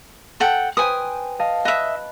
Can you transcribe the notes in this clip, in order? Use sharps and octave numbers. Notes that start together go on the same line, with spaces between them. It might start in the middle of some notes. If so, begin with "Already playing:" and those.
A4 F#5 G5
B4 C5 G5 G#5 D#6
D#5 F5 A5
D#5 E5 B5 F#6